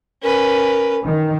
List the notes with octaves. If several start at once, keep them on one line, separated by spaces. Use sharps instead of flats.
C#4 A#4 B4
D#3